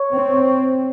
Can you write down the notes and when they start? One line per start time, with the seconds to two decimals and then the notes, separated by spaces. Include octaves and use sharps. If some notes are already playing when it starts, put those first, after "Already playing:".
Already playing: C#5
0.13 C4